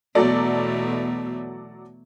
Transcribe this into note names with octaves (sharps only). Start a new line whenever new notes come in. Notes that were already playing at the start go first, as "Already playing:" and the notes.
E2 B2 F#3 A3 A4 D5